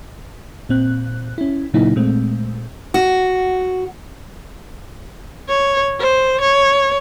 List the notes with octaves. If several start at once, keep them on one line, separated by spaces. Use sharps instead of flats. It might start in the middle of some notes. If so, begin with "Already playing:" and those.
A#2 C4 F#6
C#4 E4
A#2 C#3 F#3 A#3 D#4 E4
A#2 G#3 A3 C4
F#4
C#5
C5
C#5